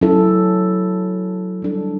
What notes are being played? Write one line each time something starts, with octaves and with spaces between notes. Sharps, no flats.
F#3 C#4 E4 A4
G3 D4 A4